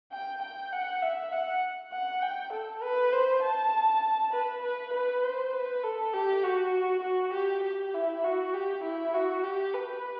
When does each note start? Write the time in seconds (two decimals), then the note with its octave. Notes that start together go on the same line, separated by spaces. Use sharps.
0.12 G5
0.42 G5
0.73 F#5
1.02 E5
1.32 F#5
1.92 F#5
2.22 G5
2.53 A4
2.83 B4
3.13 C5
3.43 A5
4.33 B4
4.63 B4
4.93 B4
5.23 C5
5.53 B4
5.84 A4
6.13 G4
6.43 F#4
7.03 F#4
7.33 G4
7.63 G4
7.94 E4
8.24 F#4
8.54 G4
8.83 E4
9.14 F#4
9.44 G4
9.74 B4